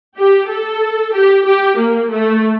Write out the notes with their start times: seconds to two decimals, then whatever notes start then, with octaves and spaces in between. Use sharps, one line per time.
0.18 G4
0.50 A4
1.13 G4
1.46 G4
1.77 A#3
2.10 A3